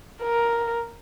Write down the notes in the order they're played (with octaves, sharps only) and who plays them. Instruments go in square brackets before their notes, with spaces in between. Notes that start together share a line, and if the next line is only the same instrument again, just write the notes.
[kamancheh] A#4